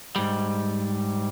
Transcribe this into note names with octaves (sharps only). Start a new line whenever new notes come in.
G#2 G3